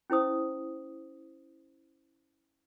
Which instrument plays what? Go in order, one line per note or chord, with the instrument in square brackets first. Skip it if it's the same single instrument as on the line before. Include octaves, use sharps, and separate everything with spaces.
[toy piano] C#4 E4 C5 D#6